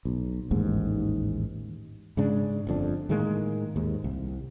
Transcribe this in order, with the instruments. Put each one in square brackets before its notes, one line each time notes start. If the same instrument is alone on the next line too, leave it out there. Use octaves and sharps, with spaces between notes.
[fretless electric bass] B1
A1 D#2 G#2
G#2 C#3 G#3 D4
G1 F2 D4
A2 D#3 G#3 A#3
D#2 G#2
C2